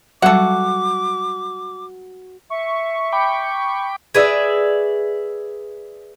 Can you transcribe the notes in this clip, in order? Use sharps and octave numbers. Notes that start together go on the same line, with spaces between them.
F#3 G3 F#4 A4 F#5 D6
E5 C#6
G5 B5 D6
G#4 B4 D5 E5